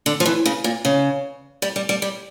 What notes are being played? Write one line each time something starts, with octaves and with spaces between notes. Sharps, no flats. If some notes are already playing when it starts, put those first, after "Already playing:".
D3
F3
E3
C#3
A#2
C#3
G3
G3
G3
G3